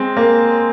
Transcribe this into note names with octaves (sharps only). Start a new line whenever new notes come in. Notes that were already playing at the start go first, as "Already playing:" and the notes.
Already playing: G#3 C4
A#3